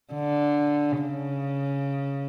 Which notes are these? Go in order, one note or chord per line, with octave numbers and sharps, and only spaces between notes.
D3
C#3